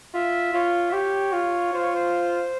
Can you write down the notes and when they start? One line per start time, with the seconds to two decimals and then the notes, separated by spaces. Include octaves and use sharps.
0.14 F4 E5
0.53 F4 C#5
0.89 E5
0.93 G4 C#5
1.33 F4
1.73 F4 C5
1.83 C#5
1.95 C5